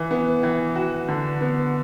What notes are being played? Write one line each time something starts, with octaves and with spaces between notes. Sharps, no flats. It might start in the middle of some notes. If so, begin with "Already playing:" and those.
Already playing: E3
B3
E3
F#4
D3
B3